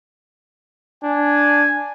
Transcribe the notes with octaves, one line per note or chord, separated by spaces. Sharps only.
D4 G#5